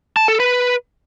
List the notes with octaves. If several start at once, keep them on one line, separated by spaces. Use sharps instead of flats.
A5
A4
B4